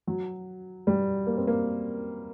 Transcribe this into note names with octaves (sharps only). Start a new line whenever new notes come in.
F#3
G3
A#3
C4
A#3